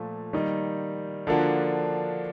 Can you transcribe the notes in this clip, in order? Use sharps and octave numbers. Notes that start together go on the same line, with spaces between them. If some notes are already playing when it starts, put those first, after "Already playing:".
Already playing: A#2 F3 A3
D#3 G3 A#3 D#4
D3 F3 A#3 D4 F#4